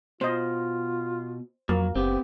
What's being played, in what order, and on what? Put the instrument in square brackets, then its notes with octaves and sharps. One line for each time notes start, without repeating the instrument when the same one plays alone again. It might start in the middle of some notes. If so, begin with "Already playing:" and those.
[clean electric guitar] B2 [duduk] F4 [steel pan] C5 D#5
[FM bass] F2 [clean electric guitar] F#3 [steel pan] A#3
[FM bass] F#1 [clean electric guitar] B3 C4 [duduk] G4